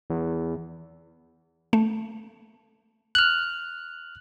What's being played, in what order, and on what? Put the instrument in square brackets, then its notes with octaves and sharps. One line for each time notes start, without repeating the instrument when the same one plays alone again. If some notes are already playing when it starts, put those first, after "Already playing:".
[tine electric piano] E2
[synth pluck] A3
[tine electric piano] F6 F#6